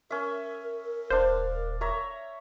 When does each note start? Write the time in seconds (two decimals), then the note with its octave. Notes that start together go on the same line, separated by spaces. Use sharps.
0.10 C#4 A#4 E5
1.10 D#1 D4 C5 F5
1.81 C#5 E5 A#5